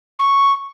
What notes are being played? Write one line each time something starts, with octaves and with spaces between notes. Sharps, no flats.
C#6